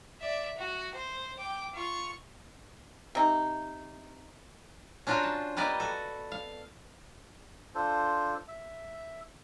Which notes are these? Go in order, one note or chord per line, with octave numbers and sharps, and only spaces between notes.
D5 E5
F#4
C5
G5 D6
F4 C#6
C3 D#4
C#4 D4 F4 F#4 A#4 C5
A5
G3 A#3 B3 B4 D5 D#5
F#4 A4
F5
D4 F4 A4 C5
E5